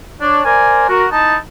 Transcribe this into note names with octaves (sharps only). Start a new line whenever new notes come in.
D4 C#5 D5
A#4 C5 D5 G#5
F#4 A#4
D#4 E4 A5